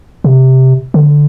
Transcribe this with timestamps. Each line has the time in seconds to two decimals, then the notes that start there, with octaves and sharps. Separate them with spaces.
0.24 C3
0.94 D3